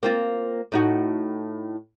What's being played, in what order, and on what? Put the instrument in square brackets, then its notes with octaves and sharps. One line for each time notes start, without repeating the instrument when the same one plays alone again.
[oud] A#3 C4 F4
A2 D#4 F#4